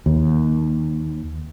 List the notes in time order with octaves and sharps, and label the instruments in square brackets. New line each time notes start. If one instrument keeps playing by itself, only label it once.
[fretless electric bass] D#2